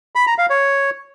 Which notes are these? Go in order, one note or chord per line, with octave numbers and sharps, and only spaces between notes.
B5
A#5
F5
C#5